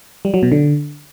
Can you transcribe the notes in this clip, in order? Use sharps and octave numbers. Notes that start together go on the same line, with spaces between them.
G3
F#3
B2
D3